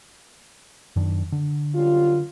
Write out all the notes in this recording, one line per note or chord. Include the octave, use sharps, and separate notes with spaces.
F#2 D#3 D4
D3
F#2 G3 F4